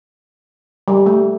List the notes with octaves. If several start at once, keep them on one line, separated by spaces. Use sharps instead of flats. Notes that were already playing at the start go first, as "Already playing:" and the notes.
G3
A3